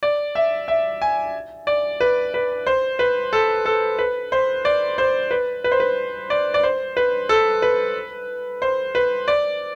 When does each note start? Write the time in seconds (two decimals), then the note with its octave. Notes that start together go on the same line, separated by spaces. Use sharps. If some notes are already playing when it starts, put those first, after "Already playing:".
0.03 D5
0.35 E5
0.68 E5
1.02 G#5
1.67 D5
2.01 B4
2.34 B4
2.66 C5
2.99 B4
3.33 A4
3.66 A4
3.99 B4
4.32 C5
4.65 D5
4.98 C5
5.31 B4
5.64 B4
5.72 C5
5.80 B4
6.30 D5
6.54 D5
6.63 C5
6.97 B4
7.29 A4
7.62 B4
8.62 C5
8.95 B4
9.28 D5